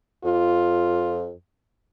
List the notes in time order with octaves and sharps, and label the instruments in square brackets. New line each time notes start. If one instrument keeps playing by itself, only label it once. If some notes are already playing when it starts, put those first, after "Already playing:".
[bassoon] F2 [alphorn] F4